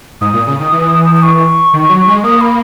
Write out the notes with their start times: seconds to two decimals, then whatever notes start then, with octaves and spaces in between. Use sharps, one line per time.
0.21 G#2 D#6
0.33 A#2
0.47 C#3
0.59 D#3
0.72 E3
1.15 D#6
1.23 C#6
1.73 D#3
1.89 F#3
2.07 G#3
2.23 A#3 D#6
2.41 B5